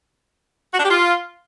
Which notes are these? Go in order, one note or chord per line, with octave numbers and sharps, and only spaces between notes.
F#4
D4
G4
F4